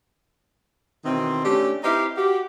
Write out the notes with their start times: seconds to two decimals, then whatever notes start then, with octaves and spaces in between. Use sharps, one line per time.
1.05 B2 D#3 E3 C4
1.44 A3 C#4 D4 G4
1.83 C4 D#4 E4 G4 B4 F5
2.17 F#4 G4